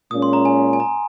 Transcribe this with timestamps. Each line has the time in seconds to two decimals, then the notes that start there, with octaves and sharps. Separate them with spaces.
0.11 A#2 G#3 C#4 D#6
0.22 C6
0.33 A#5
0.45 G#5
0.73 G#5
0.80 A#5